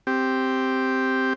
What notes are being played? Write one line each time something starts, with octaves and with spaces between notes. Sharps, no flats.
C4 G4